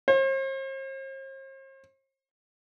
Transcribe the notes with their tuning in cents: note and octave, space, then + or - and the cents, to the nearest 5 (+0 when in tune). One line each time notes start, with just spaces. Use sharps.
C5 +45